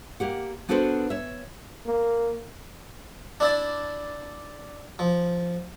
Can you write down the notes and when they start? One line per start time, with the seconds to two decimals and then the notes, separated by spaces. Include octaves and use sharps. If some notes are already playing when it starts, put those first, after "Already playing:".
0.20 A#3 G4 F#5
0.69 B3 D4 F#4 A4 B4 C5
1.10 C#5 E5
1.86 A#3
3.40 D4 E4 D5
4.99 F3